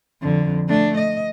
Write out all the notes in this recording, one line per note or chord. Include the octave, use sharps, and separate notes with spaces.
F2 D3
A3 D4
D#5